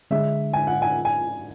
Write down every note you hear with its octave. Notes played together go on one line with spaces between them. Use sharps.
D3 G#3 D4 G#4 E5
G#5
F#5
G#5
G#5